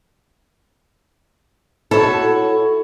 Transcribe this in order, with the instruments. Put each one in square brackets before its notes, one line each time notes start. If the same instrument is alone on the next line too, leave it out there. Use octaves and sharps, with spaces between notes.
[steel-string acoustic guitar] E4 F#4 C#5 [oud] A4